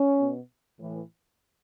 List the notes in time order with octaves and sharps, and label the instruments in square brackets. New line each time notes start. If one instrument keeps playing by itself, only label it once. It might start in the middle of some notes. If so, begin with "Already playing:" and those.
Already playing: [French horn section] C#4
B2
A2 E3